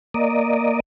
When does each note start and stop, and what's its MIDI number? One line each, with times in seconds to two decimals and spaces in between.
0.14 0.80 58
0.14 0.80 74
0.14 0.80 75